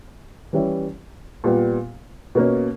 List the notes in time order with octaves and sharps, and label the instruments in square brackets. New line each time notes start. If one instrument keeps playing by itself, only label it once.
[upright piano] E3 G3 C#4 E4
A#2 G3 B3
B2 A#3 C#4